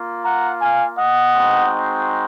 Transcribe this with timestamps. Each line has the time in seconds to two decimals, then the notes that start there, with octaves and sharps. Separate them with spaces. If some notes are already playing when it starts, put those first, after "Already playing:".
Already playing: A#3 F4
0.24 F#5 A#5
0.61 F5 G#5
0.98 D#5 F#5
1.35 G#3 C4 D#4 F#4